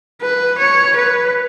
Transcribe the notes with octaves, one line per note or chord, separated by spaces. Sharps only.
B4
C#5
B4